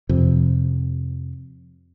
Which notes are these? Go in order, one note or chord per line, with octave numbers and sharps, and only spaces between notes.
F2 C3